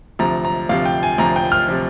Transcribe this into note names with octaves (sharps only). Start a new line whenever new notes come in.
D2 C3 F3 A#5
A#5
D2 C3 F3 F5
G5
G#5
D2 C3 F3 A#5
G5
F6
C3 F3